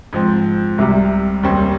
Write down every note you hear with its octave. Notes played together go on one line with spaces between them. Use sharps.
G#2 F3 C4
C2 C3 G3
D#2 C#3 G3 C4